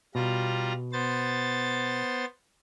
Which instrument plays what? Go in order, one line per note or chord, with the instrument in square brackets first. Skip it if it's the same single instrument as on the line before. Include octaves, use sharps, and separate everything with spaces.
[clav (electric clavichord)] B2 [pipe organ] G3 F4 A#5
[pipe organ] B3 C5 A6